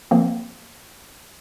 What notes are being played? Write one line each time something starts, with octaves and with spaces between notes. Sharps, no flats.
F3 A#3 C4